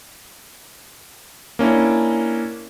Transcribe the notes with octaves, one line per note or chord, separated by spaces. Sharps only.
A#3 C#4 D4 E4